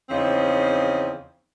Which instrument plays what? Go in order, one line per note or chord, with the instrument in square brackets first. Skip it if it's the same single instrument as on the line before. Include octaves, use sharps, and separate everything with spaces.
[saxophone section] E2 C#3 F3 C4 D#4